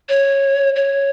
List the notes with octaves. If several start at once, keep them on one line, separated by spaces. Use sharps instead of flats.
C#5
C#5